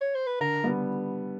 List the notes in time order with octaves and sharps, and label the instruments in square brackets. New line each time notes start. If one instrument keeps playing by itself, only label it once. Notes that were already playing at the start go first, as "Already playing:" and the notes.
[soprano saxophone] C#5
C5
B4
[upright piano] D3 [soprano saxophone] A#4
[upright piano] G3 B3